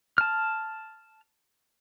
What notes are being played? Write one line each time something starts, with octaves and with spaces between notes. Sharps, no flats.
A5 F6